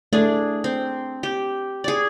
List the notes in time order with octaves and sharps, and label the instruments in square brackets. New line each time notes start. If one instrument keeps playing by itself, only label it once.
[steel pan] A3 [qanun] D4 G#4
[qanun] C4
G4
G#4 D5